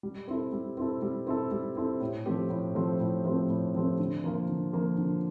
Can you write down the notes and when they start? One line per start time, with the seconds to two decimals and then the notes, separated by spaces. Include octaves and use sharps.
0.03 G3
0.28 C4 E4 A4
0.52 G3
0.77 C4 E4 A4
1.02 G3
1.27 C4 E4 A4
1.52 G3
1.76 C4 E4 A4
2.01 A2
2.26 F3 A3 C4 G4
2.50 A2
2.75 F3 A3 C4 G4
3.00 A2
3.25 F3 A3 C4 G4
3.50 A2
3.74 F3 A3 C4 G4
3.99 D3
4.24 F3 A#3 F4
4.49 D3
4.73 F3 A#3 F4
4.98 D3